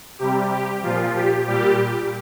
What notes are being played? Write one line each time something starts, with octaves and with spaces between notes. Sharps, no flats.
C3 G3 G4
G4
A#2 F3 F4
G4
A#2 G3 G4